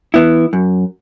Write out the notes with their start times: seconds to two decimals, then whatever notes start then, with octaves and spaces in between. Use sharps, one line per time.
0.14 E3 B3 E4
0.53 F#2